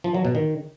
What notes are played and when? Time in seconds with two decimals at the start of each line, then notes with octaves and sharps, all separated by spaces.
0.04 F3
0.14 F#3
0.25 B2
0.35 D#3